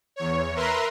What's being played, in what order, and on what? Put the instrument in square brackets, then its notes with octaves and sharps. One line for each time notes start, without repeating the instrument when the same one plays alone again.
[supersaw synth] E2 C#5
A#4 B4 E5 A#5 C6